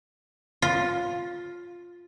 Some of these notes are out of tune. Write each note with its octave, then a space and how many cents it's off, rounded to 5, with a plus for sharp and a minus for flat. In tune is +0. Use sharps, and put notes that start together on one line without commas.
F4 +5